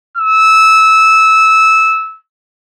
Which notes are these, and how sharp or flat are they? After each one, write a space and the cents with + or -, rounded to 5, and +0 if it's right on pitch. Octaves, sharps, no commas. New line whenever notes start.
E6 -15